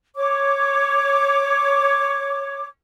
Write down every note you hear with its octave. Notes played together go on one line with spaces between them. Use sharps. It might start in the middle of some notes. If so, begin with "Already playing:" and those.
C#5 D6